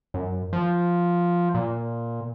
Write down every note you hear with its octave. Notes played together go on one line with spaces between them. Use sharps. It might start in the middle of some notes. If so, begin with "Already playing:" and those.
F#2
F3
A#2